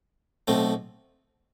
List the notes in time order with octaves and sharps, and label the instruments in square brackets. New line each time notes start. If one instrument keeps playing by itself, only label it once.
[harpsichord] B1 B2 A3 C4